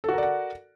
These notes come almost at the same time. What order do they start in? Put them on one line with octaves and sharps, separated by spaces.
A4 F#4 A#4 D5 F#5